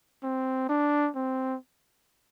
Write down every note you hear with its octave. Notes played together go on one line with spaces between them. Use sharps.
C4
D4
C4